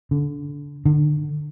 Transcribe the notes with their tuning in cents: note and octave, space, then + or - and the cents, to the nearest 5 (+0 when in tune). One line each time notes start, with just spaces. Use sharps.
D3 -25
D3 +30